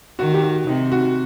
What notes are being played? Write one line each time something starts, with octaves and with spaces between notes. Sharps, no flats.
D#3 F#4
G4
F#4
C3 D#4
F#4